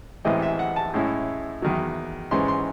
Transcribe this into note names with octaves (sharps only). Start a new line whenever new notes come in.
A1 A2 E3 G#3 C4 D#5
E5
F#5
A5
A2 G#3 C#4 E4
E2 D#3 F#3
G#2 E3 G#3 C#4 C6
C6